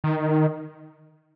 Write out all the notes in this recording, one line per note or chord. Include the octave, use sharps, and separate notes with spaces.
D#3